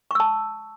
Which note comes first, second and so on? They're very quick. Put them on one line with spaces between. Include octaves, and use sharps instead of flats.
C#6 E6 A5